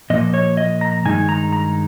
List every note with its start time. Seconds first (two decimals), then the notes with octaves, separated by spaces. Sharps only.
0.10 A#2 F3 A#3 D#5
0.34 C#5
0.57 D#5
0.81 A#5
1.05 G2 D#3 G#3 D#4 G#5
1.29 A#5
1.53 A#5